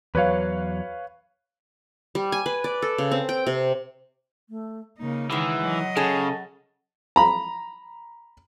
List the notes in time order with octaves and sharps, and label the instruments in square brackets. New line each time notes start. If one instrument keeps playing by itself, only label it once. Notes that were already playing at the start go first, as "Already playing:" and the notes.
[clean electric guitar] E2 F#3 [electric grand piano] B4 C#5 F5
[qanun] G3
G#5
B4
D5
A4
C#3
C4
G5
C3
[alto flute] A3
[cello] C#3 D#4 [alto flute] A#3
[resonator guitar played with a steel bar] D#3 G#3 [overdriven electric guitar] E3 [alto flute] F#5
[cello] F#3 D#5
[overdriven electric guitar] C#3 [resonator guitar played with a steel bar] G#4 A4
[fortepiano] A#5 B5